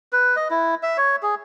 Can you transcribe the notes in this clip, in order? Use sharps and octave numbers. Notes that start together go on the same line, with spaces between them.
B4
D#5
E4
E5
C#5
G#4